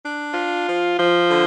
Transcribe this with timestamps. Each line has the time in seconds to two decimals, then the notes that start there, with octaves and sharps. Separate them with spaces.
0.02 D4
0.34 F4
0.67 F3
0.99 F3
1.30 D3